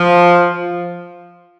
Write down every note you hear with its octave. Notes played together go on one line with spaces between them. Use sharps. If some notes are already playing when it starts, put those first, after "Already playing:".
Already playing: F3